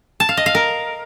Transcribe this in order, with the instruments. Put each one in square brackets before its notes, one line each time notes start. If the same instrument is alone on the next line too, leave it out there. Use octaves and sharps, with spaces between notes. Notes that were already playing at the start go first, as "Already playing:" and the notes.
[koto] A5
F5
D#5
F5
A#4